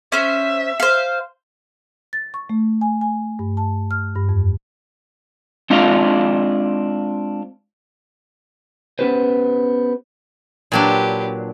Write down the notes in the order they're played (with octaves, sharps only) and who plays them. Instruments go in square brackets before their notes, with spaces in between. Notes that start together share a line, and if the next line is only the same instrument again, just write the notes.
[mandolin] C#4 C5 [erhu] E5
[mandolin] C5 F5
[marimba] A6
C#6
A3
G#5
G#5
G2
A5
F6
G2
F2
[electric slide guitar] G#3 C4 D4 F4 F5
[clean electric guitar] B3 C#4 G4 B4 C5
[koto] A#2 F#3 D4 [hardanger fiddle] G4 B4